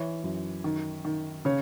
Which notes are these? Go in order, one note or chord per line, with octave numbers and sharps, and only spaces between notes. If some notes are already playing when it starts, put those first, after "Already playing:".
Already playing: E3 C#5
F#2
D#3
D#3
C#3 C#5